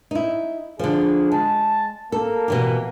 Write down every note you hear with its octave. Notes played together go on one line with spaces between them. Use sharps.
D#4 E4
D3 F3 G#4
G#3 A5
A#3 A4
B2 E3 G4